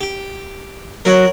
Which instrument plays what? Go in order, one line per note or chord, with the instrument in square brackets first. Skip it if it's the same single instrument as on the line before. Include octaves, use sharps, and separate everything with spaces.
[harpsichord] G4
[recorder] F#3 [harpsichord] A#4 C#5 F#5